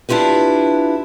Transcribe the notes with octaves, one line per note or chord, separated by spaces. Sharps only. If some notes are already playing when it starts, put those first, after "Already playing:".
D4 E4 F4 G4 B4